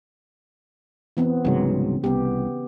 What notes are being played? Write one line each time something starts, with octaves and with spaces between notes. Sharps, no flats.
E3 B3 C4
C2 G#2 C#3 F#3
C2 B3 G4